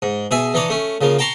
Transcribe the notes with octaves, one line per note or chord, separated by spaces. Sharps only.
G#2
B2 G#4 E5 G#5
E3 D4 D#4 C#5 D5
A3 C#4
C#3 F3 A#3
G5 A5 A#5 C6 C#6